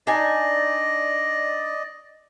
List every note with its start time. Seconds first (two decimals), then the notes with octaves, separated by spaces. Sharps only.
0.07 D4 D#4 D5 D#5 G#5